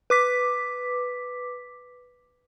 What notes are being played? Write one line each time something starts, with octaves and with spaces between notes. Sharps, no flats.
B4 D6 B6